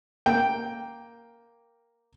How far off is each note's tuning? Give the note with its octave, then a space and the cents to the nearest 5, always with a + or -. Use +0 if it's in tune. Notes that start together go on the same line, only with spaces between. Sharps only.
A#3 +0 G5 +0